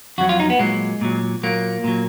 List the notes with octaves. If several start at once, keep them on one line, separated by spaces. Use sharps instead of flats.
F2 D#3 F#3 F#4
F4
D#4
B3
A#2 F#3 G#3
A#2 F#3
A#2 F#3 A#3
A#2 F#3